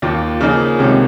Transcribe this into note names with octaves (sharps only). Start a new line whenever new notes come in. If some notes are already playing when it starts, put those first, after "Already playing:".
D#2 D#3 A#3 F4
C#3 F3 A#3 D#4 G#4
C2 C3 D#3 G#3 C#4